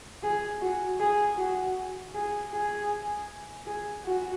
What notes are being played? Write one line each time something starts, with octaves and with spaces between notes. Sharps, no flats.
G#4
F#4
G#4
F#4
G#4
G#4
G#4
F#4